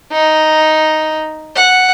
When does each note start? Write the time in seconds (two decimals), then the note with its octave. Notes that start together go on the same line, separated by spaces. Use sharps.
0.13 D#4
1.56 F#5